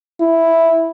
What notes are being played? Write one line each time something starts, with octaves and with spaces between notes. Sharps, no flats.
E4